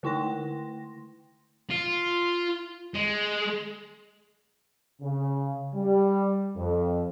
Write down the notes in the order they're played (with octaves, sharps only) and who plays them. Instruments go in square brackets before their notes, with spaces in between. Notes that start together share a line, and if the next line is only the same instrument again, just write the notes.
[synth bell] D3 A3 E4 G5 C6 A#6
[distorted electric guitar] F4
G#3
[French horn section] C#3
G3
F2